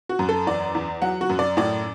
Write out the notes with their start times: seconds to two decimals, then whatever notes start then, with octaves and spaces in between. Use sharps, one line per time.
0.09 F#4
0.19 F#2
0.29 A4
0.47 E2 D5
0.75 E2
1.02 F#3 F#5
1.21 F#4
1.30 F#2
1.39 D5
1.57 A2 D5